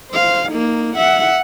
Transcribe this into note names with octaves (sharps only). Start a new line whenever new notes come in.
C5 F5
A#3 D#4
E5 F#5